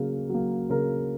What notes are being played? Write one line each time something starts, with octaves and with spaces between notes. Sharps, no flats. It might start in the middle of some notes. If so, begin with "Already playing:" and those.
Already playing: C#3 F#3 A#3
F#3 A#3
C#3 A#4